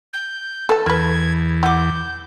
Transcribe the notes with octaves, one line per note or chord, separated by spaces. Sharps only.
G6
E3 A4 A5
E2 A#4 B4 G#6
E4 F#5 D6 G6